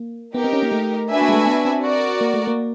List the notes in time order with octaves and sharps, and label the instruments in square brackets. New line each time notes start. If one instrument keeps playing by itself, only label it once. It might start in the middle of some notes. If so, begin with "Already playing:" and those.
Already playing: [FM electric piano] A#3
[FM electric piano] B3 [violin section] D#4 G4 A#4
[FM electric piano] C4
C#4
A#3
A3
[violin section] D4 F#4 B4 E5 G#5
[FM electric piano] A#3
G#3
A3
B3
C4
[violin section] F#4 A#4 D5
[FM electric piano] A#3
A3
A#3